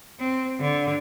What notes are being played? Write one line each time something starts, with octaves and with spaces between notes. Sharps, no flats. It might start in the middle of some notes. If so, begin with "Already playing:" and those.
C4
D3